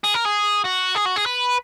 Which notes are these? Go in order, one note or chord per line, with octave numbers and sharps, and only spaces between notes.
G#4
A#4
G#4
F#4
G#4
F#4
G#4
B4